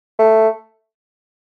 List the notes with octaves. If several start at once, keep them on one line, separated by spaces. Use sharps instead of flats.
A3